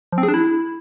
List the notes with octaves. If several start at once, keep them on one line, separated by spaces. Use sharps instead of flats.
F3
C4
G#4
D4
E4